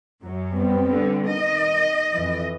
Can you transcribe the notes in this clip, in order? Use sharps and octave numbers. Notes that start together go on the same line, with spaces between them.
F#2 F#3
G3 B3 C4
D3
D#3 D#5
F2 E3